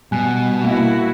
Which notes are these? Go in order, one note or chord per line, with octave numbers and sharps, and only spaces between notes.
B2 G3 G#5 F#6
A#3 E4 F#4